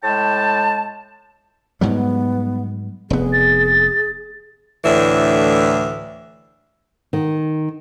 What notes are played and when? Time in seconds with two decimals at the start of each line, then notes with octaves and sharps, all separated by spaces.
0.04 A2 G#3 G5 A5
1.81 G#2 F#3 G3 B3
3.10 F1 B3 G#4
3.33 A6
4.84 D2 A2 E3 D4 E5
7.13 D#3